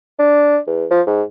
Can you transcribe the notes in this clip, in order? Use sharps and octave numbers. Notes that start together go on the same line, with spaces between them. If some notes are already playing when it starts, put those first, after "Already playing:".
D4
E2
F3
G#2